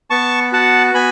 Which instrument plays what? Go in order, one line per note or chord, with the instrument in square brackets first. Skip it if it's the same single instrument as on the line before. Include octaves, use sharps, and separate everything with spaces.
[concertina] B3 A5 C#6
F#4 F#5 A5
B3 G#5 B5